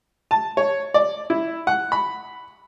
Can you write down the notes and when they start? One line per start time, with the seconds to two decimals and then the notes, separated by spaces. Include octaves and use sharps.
0.31 A5
0.57 C#5
0.94 D5
1.30 E4
1.67 F#5
1.92 B5